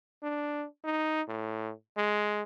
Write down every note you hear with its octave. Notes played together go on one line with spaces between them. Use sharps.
D4
D#4
A2
G#3